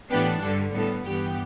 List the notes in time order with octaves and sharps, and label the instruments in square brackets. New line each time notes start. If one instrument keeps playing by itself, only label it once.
[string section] A2 E3 B3 D4 G4 B4
G2 D3 G3 A4
A2 G3 B3 A4
G2 E3 B3 G4